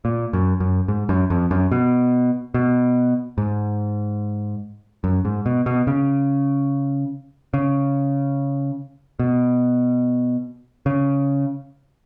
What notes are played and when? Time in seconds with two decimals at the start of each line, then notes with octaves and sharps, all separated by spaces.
0.05 A#2
0.33 F#2
0.60 F#2
0.88 G#2
1.09 F#2
1.30 F2
1.51 F#2
1.72 B2
2.54 B2
3.38 G#2
5.04 F#2
5.25 G#2
5.46 B2
5.66 B2
5.87 C#3
7.54 C#3
9.19 B2
10.86 C#3